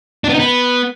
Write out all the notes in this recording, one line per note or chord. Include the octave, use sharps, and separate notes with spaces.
D4
B3
D#4
B3